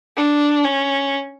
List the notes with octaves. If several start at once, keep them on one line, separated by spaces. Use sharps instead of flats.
D4
C#4